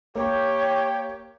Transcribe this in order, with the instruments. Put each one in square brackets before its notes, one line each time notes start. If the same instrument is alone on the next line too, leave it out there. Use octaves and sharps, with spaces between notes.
[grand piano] A#3 D6 [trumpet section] G4 [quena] C#5